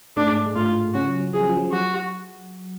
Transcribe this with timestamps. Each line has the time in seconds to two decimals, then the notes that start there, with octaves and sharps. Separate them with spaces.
0.17 A2 A3 D4
0.27 G#2 G#3
0.46 G#2 G#3
0.56 A2 A3 F4
0.94 C#3 C#4 F#4
1.08 F#3
1.20 F#3
1.33 F3 G#4
1.41 F#3
1.49 F3
1.57 F#3
1.64 F3
1.72 F#3 F#4